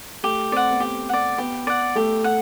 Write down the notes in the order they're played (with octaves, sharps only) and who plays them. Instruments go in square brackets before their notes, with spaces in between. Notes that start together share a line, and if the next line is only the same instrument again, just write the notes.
[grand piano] A3 [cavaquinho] G4
[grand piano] C4 [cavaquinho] D5 F#5
[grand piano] B3
[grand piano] C4 [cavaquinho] G4
[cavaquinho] D5 F#5
[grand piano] B3 [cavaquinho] G4
[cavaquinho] D5 F#5
[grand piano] A3 [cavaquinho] G4
[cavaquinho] F#5